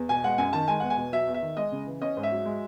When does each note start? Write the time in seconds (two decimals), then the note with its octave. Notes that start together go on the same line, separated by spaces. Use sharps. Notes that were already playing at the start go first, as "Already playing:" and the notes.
Already playing: E2
0.09 B2 G#5
0.24 G#3 F#5
0.38 F#2 G#5
0.53 D#3 A5
0.68 G#3 G#5
0.80 E2 F#5
0.90 G#5
0.97 B2
1.13 F#3 E5
1.27 E2
1.34 E5
1.42 D#3
1.57 G#3 D#5
1.72 C#3
1.87 E3
2.01 C#4 D#5
2.17 G#2
2.23 E5
2.32 F#3
2.45 G#3